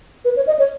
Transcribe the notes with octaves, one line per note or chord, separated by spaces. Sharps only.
B4
C#5
D#5
C#5